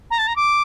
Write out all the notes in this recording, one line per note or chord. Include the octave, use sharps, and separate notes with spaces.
A#5
A5
A#5
D6